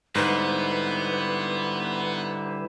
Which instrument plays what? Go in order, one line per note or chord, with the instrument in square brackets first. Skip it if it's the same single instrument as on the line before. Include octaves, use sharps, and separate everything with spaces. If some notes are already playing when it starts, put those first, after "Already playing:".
[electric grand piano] G#2 [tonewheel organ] D3 G3 E4 [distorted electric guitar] B3 [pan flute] B4